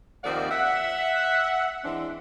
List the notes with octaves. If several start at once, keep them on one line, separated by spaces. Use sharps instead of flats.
D#2 F3 A#3 C4 D5 F#5
E5 F#5
E3 G#3 C4 D4